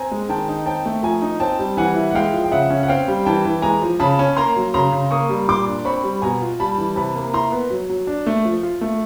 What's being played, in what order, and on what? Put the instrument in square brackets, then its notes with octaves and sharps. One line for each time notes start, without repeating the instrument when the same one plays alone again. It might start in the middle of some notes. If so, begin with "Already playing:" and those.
Already playing: [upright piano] C4 G#5 A#5
G#3
D#3 G5 A5
D#4
C4 G5 A5
A3
F3 G#5 A#5
D#4
C4 G5 A5
G3
E3 F#5 G#5
E4
F#5
G#3 F5 G5
F3
G5
C#3 E5 F#5
C#4
F#5
C4 F5 G5
G3
E3 G5 A5
E3
G#3 G#5 A#5
F3
C#3 A5 B5
C#4
A#3 A#5 C6
F#3
C#3 A#5 C6
C#3
A#3 C#6 D#6
G3
A#2 C6 D6
D4
C4 B5 C#6
G3
B2 G#5 A#5
F4
G3 A5 B5
E3
C3 A5 B5
A#3
E4 A#5 C6
B3
F#3
F#3
D4
A3
F3
F4
A3